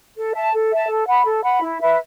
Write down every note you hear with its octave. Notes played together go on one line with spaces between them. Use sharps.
A4
E5 A5
A4
E5 A5
A4
F#5 B5
A4
F#5 B5
E4
B4 E5